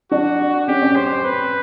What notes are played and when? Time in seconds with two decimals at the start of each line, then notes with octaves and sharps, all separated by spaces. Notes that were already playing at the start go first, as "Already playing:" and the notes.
0.11 D4 F#4 D5
0.68 C#4 G4 C#5
0.82 C#4 C#5
0.96 C5
1.24 B4